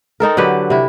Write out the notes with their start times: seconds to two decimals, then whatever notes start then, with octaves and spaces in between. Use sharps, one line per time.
0.20 C4 D#4 A4 A#4
0.37 D3 F#3 G4 B4
0.70 C3 E4